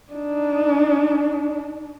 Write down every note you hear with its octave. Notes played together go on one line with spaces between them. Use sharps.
D4 D#4